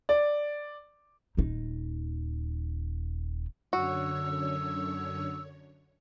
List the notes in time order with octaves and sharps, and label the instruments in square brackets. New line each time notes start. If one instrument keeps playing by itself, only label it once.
[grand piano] D5
[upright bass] D#1 D#4
[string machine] F#2 D3 C#5 [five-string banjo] F#4 [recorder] E6